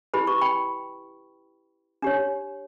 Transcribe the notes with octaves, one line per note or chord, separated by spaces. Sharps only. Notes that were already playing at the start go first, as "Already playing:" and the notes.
E4 G4 B4 B5
C#6
G5 B5
D4 G4 C#5